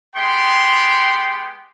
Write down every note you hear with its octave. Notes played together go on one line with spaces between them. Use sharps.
G#3 B3 G4 G5 C6